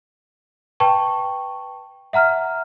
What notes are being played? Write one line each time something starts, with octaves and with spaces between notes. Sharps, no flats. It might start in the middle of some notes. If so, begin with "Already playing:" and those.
B4 G5 A5 C#6
E5 F#5 A#5 F6